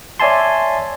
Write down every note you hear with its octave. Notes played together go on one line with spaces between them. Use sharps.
C#5 D5 E5 G#5 A5 C6